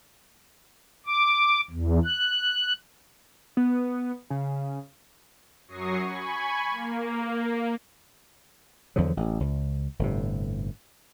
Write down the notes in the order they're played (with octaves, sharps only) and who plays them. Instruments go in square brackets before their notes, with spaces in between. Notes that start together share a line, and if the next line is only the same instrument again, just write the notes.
[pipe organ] D6
E2
F#6
[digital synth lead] B3
C#3
[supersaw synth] F#2 F#3 C#6 D#6 A#6 C7
G#5 B5 C#6 G#6
A#3
[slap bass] E2 D3 F3 F#3
A1
C#2
G1 A2 C3